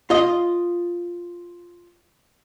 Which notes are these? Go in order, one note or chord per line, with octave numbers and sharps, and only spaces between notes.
F4 D#5